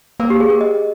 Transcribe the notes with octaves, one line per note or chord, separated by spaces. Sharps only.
A#3 A#4
G4
G#4
A#4
D#5